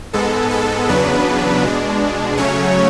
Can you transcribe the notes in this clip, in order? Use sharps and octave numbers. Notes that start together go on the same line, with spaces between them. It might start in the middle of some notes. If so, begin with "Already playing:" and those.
G#2 G#3 B3 A4
A4
E2 C#3 F#3 B3 D4 B4
B2 G#3 D4
C#3 F#3 A3 C#4 C#5